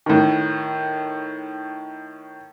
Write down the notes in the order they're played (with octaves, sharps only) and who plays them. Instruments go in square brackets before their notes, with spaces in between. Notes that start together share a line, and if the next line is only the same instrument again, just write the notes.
[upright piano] A2 D#3